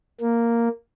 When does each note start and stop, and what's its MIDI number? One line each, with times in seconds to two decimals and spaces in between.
0.21 0.69 58